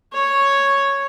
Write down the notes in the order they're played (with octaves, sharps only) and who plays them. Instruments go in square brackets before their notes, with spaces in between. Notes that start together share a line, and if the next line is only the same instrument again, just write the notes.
[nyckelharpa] C#5